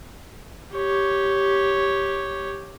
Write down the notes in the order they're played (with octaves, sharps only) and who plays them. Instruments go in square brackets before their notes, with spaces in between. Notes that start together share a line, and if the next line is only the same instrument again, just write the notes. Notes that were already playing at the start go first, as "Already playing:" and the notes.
[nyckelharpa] G4 C#5